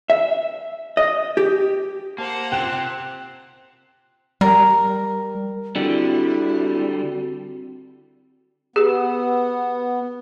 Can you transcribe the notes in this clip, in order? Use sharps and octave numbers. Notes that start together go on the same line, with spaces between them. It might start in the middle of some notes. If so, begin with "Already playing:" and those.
E5
D#5
G4
A#3 C5 F#5 A5
C3 C4 F4 G5 F#6 E7
G3 A#4
D3 G3 C4 E4 F#4
B3 G4 G#4